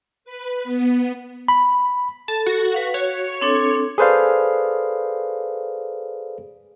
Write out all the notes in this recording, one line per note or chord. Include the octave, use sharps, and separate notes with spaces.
B4
B3
B5
A4 A5
F#4 A4
B4 F5 F#5
F#4 C#5
C4 D4 A4
G#4 A4 B4 C5 D5 F5